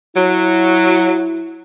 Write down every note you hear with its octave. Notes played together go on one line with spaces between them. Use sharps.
F#3 E4